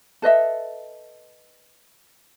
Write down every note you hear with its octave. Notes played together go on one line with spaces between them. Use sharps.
A4 B4 D#5 E5